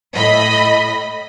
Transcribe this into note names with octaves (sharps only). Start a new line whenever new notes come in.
A2 D#5 B5